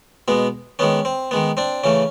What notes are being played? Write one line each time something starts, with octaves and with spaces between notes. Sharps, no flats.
B2 G#3 B3
D#3 G#3 B3 C#4
C4
D#3 G#3 B3
C4 D4
C#3 E3 A3 C#4